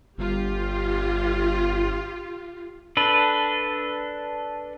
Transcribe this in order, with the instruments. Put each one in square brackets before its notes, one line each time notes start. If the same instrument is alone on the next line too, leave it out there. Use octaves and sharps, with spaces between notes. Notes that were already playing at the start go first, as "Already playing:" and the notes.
[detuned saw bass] G1 [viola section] F4 G4
[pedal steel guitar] D4 A4 B4